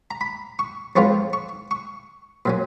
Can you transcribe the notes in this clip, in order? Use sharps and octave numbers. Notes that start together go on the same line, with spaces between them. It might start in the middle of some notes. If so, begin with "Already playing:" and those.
A#5
B5
C#6
F2 F3 G#3 B3 F4 C#6
C#6
C#6
A#2 F#3 C#4